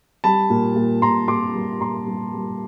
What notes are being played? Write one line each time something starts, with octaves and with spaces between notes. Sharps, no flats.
G3 A5 B5
A#2
A#2
A#2 A#5 C6
A#2 C6 D6
G3
A#2 A#5 C6
G3
G3